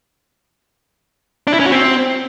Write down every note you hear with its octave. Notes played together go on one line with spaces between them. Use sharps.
D4
E4
C#4
F#4
C4